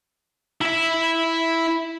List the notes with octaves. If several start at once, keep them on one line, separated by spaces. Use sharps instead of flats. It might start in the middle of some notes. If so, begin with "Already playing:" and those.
E4 E5